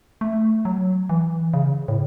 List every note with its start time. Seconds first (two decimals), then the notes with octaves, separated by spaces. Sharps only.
0.21 A3
0.65 F#3
1.09 E3
1.54 C#3
1.88 A2